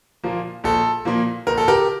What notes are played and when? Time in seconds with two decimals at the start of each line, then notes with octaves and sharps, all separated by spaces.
0.24 A#2 F3 A#3
0.64 A#1 A4
1.05 A#2 F3 A#3
1.47 A#1 A#4
1.58 A4
1.68 G4 A#4